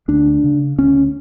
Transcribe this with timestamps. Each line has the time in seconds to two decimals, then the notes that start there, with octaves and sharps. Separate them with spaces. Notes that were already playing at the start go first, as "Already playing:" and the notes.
0.08 D2 D4
0.44 C#3
0.79 D2 C#4